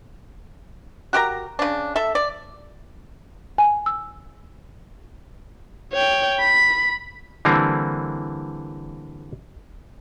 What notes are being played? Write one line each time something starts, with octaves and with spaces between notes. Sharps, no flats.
F#4 G4 A#4 A#5
C#3 D4
A4 E5
D5
G#5
E6
C#5 G5
B5
D3 E3 G3 A#3 C4